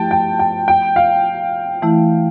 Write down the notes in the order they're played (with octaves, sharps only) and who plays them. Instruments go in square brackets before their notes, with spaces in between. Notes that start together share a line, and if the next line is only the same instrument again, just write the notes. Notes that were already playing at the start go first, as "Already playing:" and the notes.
Already playing: [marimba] F3 A3 E4 G4 [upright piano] G5 A5
[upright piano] G5
G5
G5
F5
[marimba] E3 A3 E4